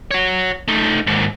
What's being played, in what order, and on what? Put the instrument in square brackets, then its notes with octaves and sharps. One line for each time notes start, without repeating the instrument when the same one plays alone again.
[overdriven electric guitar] F#4 C#5
A3 D#4
D#2 G#2